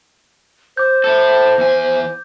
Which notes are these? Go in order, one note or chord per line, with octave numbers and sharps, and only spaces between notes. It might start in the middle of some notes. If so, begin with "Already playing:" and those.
C5 D6 G6
E4 A4
E2 G#5